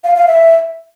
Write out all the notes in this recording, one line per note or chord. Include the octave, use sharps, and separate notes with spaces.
F5
F5
E5